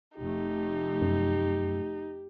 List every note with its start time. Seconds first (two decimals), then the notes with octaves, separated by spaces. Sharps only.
0.18 F1 A3 D#4 G4
1.02 F#2